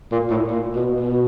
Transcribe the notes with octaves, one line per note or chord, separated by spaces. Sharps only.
A#2
A2
A#2
B2
B2